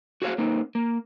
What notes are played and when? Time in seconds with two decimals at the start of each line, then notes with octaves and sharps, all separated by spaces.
0.22 F#4 G#4 C5 C#5 E5 F5
0.38 A#3 C4 D#4
0.75 A#3